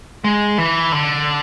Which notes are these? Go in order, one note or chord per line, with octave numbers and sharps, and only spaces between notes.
G#3
E3
D3